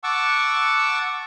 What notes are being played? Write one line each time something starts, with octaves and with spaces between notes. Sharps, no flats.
F#5 A5 C#6 D6 E6